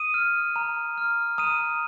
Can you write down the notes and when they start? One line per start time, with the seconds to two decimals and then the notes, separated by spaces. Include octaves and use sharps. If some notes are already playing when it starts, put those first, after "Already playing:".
Already playing: D#6 D#7
0.14 F6
0.56 A#5
0.98 F6
1.38 A#5 D#6 D#7